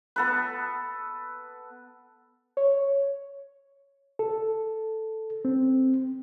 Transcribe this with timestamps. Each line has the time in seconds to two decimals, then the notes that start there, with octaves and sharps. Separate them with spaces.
0.16 B3 A4 B4
2.57 C#5
4.19 A4
5.45 C4